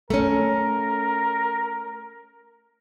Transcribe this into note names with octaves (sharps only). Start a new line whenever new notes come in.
A3 C#4 A#4